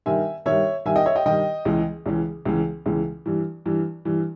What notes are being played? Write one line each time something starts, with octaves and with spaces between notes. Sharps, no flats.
G2 D#3 E5 G#5
G2 D#3 C#5 E5
G2 D#3 E5 G#5
D#5 G5
C#5 E5
D#5 G5
G2 D#3 D#5 G5
C#2 C#3 E3
C#2 C#3 E3
C#2 C#3 E3
C#2 C#3 E3
G2 E3
G2 E3
G2 E3